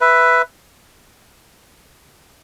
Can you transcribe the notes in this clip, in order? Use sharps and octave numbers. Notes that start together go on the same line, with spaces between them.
B4 E5